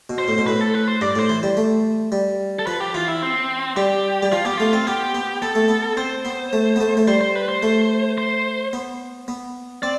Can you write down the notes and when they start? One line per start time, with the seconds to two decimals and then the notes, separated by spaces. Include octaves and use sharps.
0.10 B2
0.18 C5
0.28 A2
0.38 B2
0.46 A2 B4
0.61 A4
0.74 B4
0.88 C5
1.01 G2 D5
1.16 A2 C5
1.29 E3
1.43 G3
1.57 A3
2.12 G3
2.59 A4
2.67 F3 B4
2.80 G4
2.94 E3 F4
3.08 E4
3.22 C4
3.77 G3 G4
4.23 G3
4.32 F3 F4
4.45 B3 G4
4.58 A3 F4
4.73 C4
4.87 B3 G4
5.15 B3
5.42 B3 A4
5.55 A3
5.68 B3
5.97 C4 C5
6.25 B3
6.53 A3
6.76 B3
6.80 A3
6.97 A3
7.08 G3 C5
7.21 C5
7.35 B4
7.49 C5
7.63 A3
8.18 C5
8.73 B3
9.28 B3
9.83 C4 D5